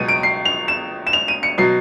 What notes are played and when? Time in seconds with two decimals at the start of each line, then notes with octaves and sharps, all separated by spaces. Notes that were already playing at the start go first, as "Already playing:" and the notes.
Already playing: C#2 B2 F#3 D#7
0.08 D7
0.23 C7
0.45 F7
0.68 E7
1.07 E7
1.13 F7
1.28 D#7
1.43 C#7
1.58 B2 F#3 C7